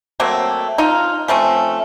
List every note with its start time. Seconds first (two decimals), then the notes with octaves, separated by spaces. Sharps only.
0.20 F#3 A3 A#3 C4
0.78 D#4 F4
1.28 F3 A3 C4 C#4